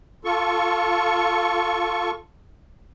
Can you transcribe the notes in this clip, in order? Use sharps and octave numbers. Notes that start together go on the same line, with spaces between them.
F4 A4 C#6